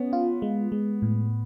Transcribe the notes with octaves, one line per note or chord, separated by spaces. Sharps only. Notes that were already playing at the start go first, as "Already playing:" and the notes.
Already playing: B3 C#4
F4
G#3
G#3
A2